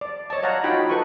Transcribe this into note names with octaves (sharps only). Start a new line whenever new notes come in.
D5
C#5 D#5 A5
C#5 D#5 F5 F#5 A#5
D#4 F4 F#4 G5 B5
A4 B4 D#5 F#5 C#6 D#6